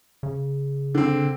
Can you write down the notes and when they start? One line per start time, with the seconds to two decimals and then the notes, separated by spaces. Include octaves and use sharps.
0.23 C#3
0.95 D3 C4